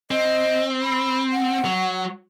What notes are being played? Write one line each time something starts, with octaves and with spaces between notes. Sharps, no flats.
C4 D#5
B5
F#5
F#3